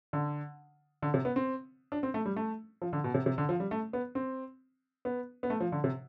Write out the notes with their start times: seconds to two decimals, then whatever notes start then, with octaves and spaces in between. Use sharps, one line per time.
0.13 D3
1.02 D3
1.14 C3
1.25 B3
1.36 C4
1.92 D4
2.03 C4
2.14 A3
2.26 G3
2.36 A3
2.82 F3
2.93 D3
3.04 B2
3.14 C3
3.26 C3
3.38 D3
3.49 F3
3.60 G3
3.71 A3
3.93 B3
4.15 C4
5.05 B3
5.43 B3
5.50 A3
5.60 F3
5.72 D3
5.84 C3